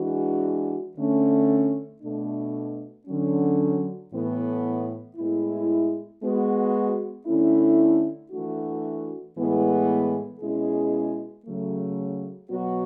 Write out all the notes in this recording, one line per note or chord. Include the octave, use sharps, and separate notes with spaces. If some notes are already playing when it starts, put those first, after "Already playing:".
Already playing: E3 G#3 D4 F#4
D3 A3 C#4
B2 A3 D4
D3 F#3 C#4
A2 E3 B3
A2 G#3 B3 E4
G#3 B3 F#4
D3 A3 C#4 E4
E3 A3 D4 F#4
A2 E3 G#3 B3
B2 G#3 C#4 E4 G#4
C#3 F#3 A3
B2 F#3 B3 F#4